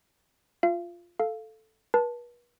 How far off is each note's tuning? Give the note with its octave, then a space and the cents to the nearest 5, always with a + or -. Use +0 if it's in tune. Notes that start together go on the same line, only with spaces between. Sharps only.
F4 +0 F5 -35
A4 +0 F5 -5
B4 -40 A5 +0